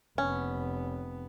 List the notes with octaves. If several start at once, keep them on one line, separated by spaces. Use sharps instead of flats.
F1 B3 C#4